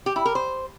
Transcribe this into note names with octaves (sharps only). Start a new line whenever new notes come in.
G4
E4
A#4
C5